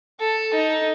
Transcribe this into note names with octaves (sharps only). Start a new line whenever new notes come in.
A4
D#4